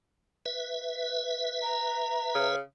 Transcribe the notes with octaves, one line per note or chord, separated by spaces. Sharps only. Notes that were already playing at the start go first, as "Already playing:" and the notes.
B4 E5
A#5
C#3